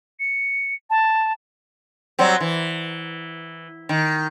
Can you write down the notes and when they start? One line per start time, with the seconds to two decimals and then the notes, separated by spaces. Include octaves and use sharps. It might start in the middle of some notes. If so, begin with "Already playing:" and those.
0.20 C#7
0.90 A5
2.19 F#3 G3 C4
2.41 E3
3.89 D#3